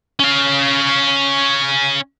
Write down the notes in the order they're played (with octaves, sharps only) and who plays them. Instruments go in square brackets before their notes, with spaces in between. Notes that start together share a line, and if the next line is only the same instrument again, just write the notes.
[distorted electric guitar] C#4 F5